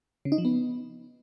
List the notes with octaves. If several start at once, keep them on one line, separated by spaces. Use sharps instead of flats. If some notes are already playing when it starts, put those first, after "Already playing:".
C#3
D#4
F3
B3